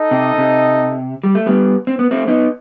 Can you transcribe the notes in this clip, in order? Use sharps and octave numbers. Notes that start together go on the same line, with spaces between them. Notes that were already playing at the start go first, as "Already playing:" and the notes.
Already playing: D#4 A4 D#5
C3
C3
G3
A3
G3 B3
C4
B3
A3 C4
B3 D#4